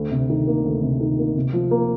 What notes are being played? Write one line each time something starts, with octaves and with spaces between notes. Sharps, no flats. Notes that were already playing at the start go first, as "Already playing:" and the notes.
Already playing: D2
C3
D#3
A#3
D2
C3
D#3
A#3
C3
F3
A#3